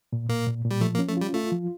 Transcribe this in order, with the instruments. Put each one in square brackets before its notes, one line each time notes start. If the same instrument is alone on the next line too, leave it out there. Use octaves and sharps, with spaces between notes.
[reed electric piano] A#2
[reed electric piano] A#2 [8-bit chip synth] A#3
[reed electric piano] A#2
A#2
[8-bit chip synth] G3
[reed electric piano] F3 [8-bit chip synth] A3
[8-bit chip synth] A#3
[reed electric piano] C#4
[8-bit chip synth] A3
[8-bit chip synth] G3 [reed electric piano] F4
[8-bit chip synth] A3 [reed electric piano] F4
[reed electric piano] F3